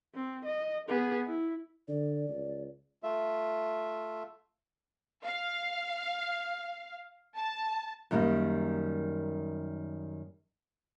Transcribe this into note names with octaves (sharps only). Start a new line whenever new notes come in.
C4
D#5
B3 G#4
E4
D3 D5
C#2
A3 F4 E5
F5
A5
F#2 D#3 G3 A3 A#3